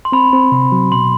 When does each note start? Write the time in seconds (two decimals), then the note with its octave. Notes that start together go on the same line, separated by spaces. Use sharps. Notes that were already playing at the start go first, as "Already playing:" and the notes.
0.05 C6
0.12 C4 B5
0.33 C4
0.52 C3
0.72 F#3
0.92 B2 C6